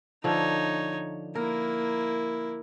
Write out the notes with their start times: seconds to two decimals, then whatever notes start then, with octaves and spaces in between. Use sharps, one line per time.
0.24 D3 F3 D#4 C#5
1.35 A#3 E4 A#4